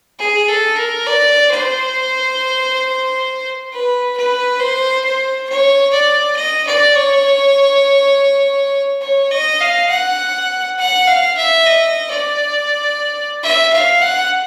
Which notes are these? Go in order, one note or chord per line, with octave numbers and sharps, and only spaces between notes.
G#4
A4
A#4
D5
C5
B4
B4
C5
C5
C#5
D5
D#5
D5
C#5
C#5
D#5
F5
F#5
F#5
F5
E5
D#5
D5
E5
F5
F#5